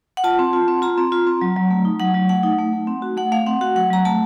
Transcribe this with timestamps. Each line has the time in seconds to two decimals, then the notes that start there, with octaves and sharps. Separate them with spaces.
0.17 F#5
0.24 F4 A5
0.39 C4
0.53 F4
0.68 C4
0.82 F4 A#5
0.98 C4
1.12 F4
1.27 C4
1.41 F#3
1.56 F#3
1.71 A3
1.85 D#4
2.00 F#3 F#5
2.14 F#3
2.29 A3 F#5
2.44 D#4
2.58 A3
2.73 A3
2.87 C4
3.02 F#4
3.17 A3 F#5
3.32 A3 F5
3.47 C4 F#5
3.61 F#4 F#5
3.76 F#3 F#5
3.91 F#3 A#5
4.05 A3 A5